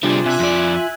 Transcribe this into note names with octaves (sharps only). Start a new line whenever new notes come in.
C3 G3 A3 D4 F4 G#4
C3 E5 G#5 F#6
F2 D5